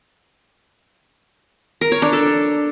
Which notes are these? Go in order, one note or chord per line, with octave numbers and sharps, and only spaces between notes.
A#4
C#5
D4
A4